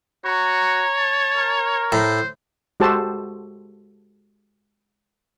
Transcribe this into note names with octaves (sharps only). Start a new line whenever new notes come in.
F#4 C#5 A#5
A5
A#4
A2 C5
G#3 F#4 G4 A4 C5 A5